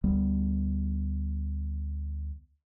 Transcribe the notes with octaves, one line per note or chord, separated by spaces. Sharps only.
D2 G3 B3